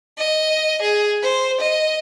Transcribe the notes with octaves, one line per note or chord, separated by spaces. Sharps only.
D#5
G#4
C5
D#5